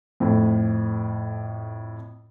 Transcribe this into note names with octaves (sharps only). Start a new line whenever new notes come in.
F2 A2